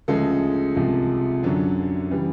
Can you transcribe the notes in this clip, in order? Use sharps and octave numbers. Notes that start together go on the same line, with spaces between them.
D2 C#3 F3 G#3 A4
C2 C3 F3 G#3
F#2 D3 F#3
C#3 E3 G3